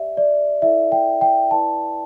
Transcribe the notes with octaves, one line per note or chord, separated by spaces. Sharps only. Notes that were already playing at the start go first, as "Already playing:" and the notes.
Already playing: G4 D5 E5
D5
E4 A4 D5 E5
G5
G5
E4 B4 D5 A5